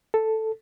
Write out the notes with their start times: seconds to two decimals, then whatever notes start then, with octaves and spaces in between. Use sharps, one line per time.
0.14 A4